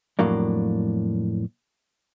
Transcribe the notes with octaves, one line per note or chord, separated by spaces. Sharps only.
F2 A2 F#3 A#3 D4